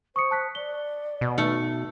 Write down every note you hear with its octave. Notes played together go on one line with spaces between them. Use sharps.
C5 C#6 D#6 C#7
A5 F#6 B6
D5 G7
B2
A3 D#4 F6 C#7